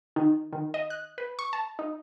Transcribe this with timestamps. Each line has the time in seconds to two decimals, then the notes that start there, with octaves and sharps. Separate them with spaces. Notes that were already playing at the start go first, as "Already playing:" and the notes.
0.16 D#3
0.53 D#3
0.74 D#5
0.90 F#6
1.18 B4
1.39 C#6
1.53 A5
1.79 D#4